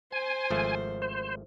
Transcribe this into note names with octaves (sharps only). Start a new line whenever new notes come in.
C5 G#5
G#1 F3 A3
C5